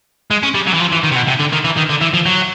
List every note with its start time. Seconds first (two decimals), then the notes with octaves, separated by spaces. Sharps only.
0.31 G#3
0.43 C#4
0.54 G3
0.67 F#3
0.74 E3
0.80 F3
0.92 E3
1.03 D#3
1.12 C3
1.16 B2
1.28 C3
1.40 D3
1.53 D#3
1.65 E3
1.77 D#3
1.89 D3
2.01 E3
2.14 F3
2.26 F#3